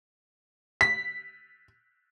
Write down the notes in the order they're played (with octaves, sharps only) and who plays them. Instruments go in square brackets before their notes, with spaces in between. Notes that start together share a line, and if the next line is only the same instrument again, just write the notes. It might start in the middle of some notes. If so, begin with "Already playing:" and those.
[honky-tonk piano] B6